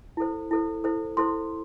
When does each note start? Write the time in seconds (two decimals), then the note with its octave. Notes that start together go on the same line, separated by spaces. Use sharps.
0.17 E4 A4 C5
0.51 E4 A4 C5
0.84 E4 A4 C5
1.17 E4 A4 C5 C6